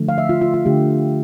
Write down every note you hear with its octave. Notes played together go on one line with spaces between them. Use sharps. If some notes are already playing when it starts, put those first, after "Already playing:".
Already playing: D3 F3 A3
F5
E5
F4
F4
F4
D3 A3 G4